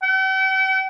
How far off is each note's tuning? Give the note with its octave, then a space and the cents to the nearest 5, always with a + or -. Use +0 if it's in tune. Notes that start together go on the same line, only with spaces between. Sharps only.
G5 -45